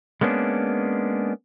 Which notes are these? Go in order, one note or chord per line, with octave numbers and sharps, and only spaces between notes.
G#3 A#3 B3 C#4 D4